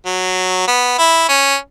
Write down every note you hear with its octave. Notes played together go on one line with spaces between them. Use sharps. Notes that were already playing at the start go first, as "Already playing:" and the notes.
F#3
B3
E4
C#4